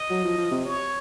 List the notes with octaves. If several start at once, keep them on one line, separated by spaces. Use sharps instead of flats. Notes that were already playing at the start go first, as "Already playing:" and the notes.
Already playing: D#5
F#3
F3
F3
C3
C#5